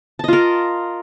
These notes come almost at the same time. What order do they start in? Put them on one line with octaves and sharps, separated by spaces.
A5 D#5 F4 A#4